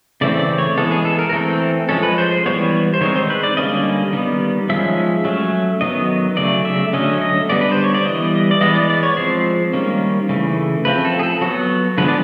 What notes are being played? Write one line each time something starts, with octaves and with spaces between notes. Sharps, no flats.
C#3 E3 A3 C4 D5
D5
C#5
E3 G#3 B3 A4
G#4
A4
A#4
A#4
E3 A3 C4 A4
F3 G#3 C#4 A4
B4
C5
C5
E3 G3 B3 C#5
C5
D#3 G#3 C4 C#5
C5
B4
D5
D3 G3 A#3 C#4 D#5
D#3 G3 B3
F3 G#3 C#4 E5
F#3 A3 C#4
D#3 F#3 B3 D#5
C#3 F#3 A3 D5
E5
D3 F#3 A3 C#4 D#5
D#5
D3 G3 B3 D5
B4
C5
C#5
D5
E3 G3 B3 D#5
D5
E3 G#3 B3 D#5
D5
D5
C#5
F3 G#3 C4 C5
D#3 G3 A#3 C#4
C#3 E3 A3
F3 A3 C4 B4
A4
G#4
A4
F#3 B3 F#4
D3 F3 G#3 B3 B4
D5